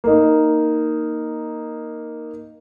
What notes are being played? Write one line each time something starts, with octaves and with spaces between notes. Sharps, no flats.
A#3 D#4